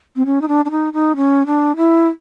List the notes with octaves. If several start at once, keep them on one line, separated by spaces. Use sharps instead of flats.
C4
C#4
D#4
D4
D4
D#4
D#4
C#4
D4
E4